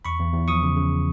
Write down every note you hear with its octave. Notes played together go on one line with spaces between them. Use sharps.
E2 B5 C#6
E2
E2
F3 C#6 D#6
C#3
C#3